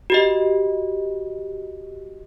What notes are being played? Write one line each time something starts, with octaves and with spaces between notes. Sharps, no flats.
F#4 G4 D#5